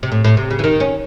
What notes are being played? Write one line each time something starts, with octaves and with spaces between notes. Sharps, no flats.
C3
A2
A2
C3
C#3
E3
D#3
C#4